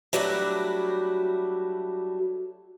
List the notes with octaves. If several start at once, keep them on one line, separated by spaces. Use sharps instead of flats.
F#3 G3 A3 D4 E4 F#4